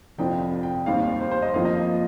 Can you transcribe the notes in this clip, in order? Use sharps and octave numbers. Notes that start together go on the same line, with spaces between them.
F1 F2 C3 F3 G5
G5
D#2 D#3 G3 C4 F5
C5
C5
D#5
F2 F3 A#3 F5
D#5
D#5